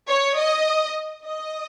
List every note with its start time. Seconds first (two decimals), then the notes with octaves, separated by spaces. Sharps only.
0.09 C#5
0.37 D#5
1.23 D#5